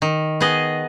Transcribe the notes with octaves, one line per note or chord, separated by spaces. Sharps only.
D#3
B3 G#4 D#5